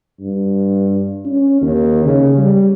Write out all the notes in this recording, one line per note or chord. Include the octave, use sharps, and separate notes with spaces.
G2
C#4
D#2
C#3
G3